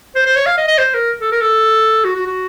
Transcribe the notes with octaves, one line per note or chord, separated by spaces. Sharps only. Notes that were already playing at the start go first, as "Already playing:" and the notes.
C5
C5
C#5
F5
D#5
D#5
C5
A#4
A4
A#4
A4
F#4
F#4
F#4